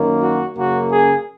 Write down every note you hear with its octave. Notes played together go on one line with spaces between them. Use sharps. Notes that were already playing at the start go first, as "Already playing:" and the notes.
Already playing: F#2 D#3 A#3
F#4
F#2 C#3 A#3 F#4
G#4